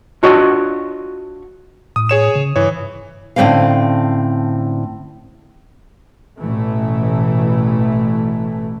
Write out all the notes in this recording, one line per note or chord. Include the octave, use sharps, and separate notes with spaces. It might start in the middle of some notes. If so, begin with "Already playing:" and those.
D4 F4 F#4 C#5 D#5
A2 D#6
G#4 C#5 E7
C#3
G2 E3 C#5
A2 D3 A3 C4 C#4 F5
A1 B2 E3 A3